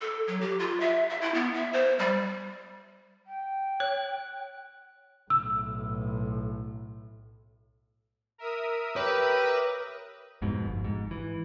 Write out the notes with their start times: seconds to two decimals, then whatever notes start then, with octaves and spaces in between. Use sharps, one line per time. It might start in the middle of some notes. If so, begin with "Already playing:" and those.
0.02 A4
0.27 F#3
0.41 G4
0.59 F4
0.80 E5
1.09 E5
1.21 E4
1.34 B3
1.54 E5
1.73 C5
1.99 G3
3.26 G5
3.80 C#5 F#6
5.30 B1 A2 E6
8.38 A#4 E5 D#6
8.96 G4 B4 C#5 B5
10.42 F2 G#2 B2
10.66 G1
10.84 G#2
11.11 E3